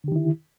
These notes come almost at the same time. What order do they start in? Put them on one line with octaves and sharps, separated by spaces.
D3 G4 D#3 E4